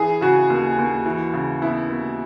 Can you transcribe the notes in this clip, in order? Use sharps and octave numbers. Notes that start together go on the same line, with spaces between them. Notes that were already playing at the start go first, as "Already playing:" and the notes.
Already playing: E3 G#4
C#3 F#4
D#2
D#2
E3
C#3
B3 E4
D#2